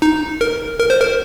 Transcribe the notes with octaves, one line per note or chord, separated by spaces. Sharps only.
D#4
A#4
A#4
C5
A#4